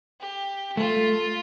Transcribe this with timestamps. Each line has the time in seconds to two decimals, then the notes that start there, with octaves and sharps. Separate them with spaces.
0.21 G4
0.77 A3 F4